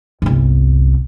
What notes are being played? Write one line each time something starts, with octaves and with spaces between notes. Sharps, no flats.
G1 C2